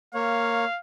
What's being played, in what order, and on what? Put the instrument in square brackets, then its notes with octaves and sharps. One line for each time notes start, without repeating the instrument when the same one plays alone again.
[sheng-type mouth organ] A#3 C#5 [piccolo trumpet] F5